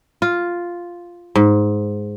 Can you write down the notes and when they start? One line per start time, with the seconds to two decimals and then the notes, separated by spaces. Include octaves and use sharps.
0.22 F4
1.36 G#2